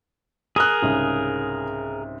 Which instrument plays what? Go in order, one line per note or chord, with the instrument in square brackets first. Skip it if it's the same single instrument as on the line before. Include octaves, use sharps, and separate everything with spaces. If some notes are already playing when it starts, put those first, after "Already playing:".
[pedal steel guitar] G#4 A#4 [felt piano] D#6 F#6
[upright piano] C2 G#2 C#3